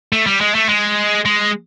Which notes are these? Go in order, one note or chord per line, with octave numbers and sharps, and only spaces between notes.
A3
G3
G#3
A3
G#3
G#3